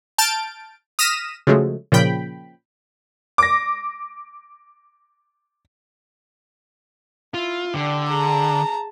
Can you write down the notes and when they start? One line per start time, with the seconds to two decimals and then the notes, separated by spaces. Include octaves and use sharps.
0.18 A5 F6 G6 A6 D7
0.99 D#6 F6 A#6 B6 D#7 E7
1.47 C#3 F3 F#3 G#3 A3
1.92 A#2 C#3 F3 G5 B5
3.38 D6 A#6
7.34 E4 F4
7.74 D3 G4 D5
8.09 G#4 A5 A#5